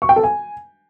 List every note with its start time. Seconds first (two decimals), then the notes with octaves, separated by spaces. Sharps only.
0.02 C#6
0.09 G5
0.16 A4
0.23 G#5